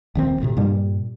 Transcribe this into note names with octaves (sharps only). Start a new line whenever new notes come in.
D#1 D#3 C4
A1 D2 A2 C3
G2 A#2 G3